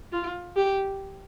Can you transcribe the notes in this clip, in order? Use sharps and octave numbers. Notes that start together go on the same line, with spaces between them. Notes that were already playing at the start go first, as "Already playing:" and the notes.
F4
G4